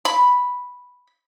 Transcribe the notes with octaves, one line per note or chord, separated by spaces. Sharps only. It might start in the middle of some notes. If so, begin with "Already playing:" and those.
B5